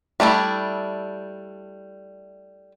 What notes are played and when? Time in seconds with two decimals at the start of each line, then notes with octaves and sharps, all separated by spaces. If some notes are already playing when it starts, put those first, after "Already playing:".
0.20 G3 A3 D4 E4